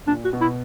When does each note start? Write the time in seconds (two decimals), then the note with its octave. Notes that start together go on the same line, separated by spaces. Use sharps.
0.07 A#2 D4
0.24 F#4
0.33 B2
0.41 E4